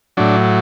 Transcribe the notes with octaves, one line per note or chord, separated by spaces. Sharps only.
A2 F#3 D4